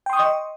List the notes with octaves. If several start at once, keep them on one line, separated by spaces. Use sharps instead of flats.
D#5 G5 C6 C#6 D#6